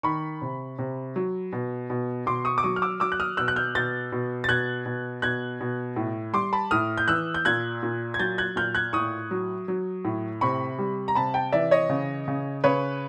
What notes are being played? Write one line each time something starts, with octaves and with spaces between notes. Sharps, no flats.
D#3 B5 C#6
C3
C3
F#3
B2
B2
B2 C6 D6
C#6 D#6
D6
F#3 C#6 D#6
F6
D6 E6
F#3 D6 E6
F#6
D#6 F6
B2 E6 F#6
F#6
F6 G6
B2 G6 A6
B2
A6
B2 F#6 G#6
B2
B2 F#6 G#6
B2
A2
G3 C6 D6
A5 B5
A2 D#6 F6
G6
E3 E6 F#6
G6
A#2 F#6 G#6
A#2
G#6
F#3 G6 A6
F#6 G#6
A#2 F6 G6
F#6 G#6
A2 C#6 D#6
F#3
F#3
A2
C3 B5 C#6
G3
A#5
C3 A5 B5
G5 A5
E3 D5 E5
C#5 D#5
C#3
C#3
C#3 B4 C#5